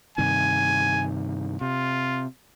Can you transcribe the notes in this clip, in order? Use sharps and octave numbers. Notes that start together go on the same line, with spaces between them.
G2 C3 D#3 G#5
C3 F4